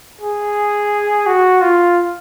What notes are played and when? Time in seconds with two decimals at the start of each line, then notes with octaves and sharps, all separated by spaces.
0.21 G#4
1.26 F#4
1.62 F4